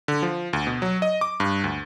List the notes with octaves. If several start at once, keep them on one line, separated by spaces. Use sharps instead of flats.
D3
F3
D2
B2
F#3
D#5
D6
G2
D2